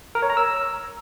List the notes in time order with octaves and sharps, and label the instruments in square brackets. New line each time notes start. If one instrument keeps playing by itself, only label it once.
[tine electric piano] A#4
C#5
A#5
E6